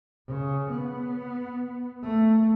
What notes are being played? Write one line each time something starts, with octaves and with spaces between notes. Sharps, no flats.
C#3
B3
A3